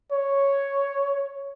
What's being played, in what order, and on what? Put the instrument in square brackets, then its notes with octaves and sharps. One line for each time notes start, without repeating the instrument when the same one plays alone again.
[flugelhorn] C#5